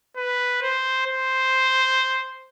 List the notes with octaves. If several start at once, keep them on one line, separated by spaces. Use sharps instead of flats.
B4
C5
C5